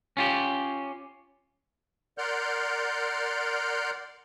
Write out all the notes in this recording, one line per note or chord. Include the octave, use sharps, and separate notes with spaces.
C#4 F4 G4
A#4 D5 F#5 C6 F6 G6